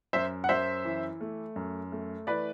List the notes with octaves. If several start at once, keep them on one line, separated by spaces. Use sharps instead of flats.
F#2 C5 E5
F#5
F#2 C5 E5
E3
A3
F#2
A3
E3 B4 D5